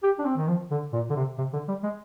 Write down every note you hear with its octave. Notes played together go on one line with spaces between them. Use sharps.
G4
D4
C4
D#3
F3
D3
A#2
D3
C3
C3
D3
G3
G#3